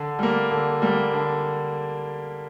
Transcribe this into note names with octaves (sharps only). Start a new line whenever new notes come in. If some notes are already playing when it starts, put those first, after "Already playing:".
Already playing: D3
G3 A#3
D3
G3 A#3
D3